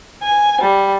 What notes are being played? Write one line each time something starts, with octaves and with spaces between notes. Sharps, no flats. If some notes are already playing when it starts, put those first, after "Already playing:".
G#5
G3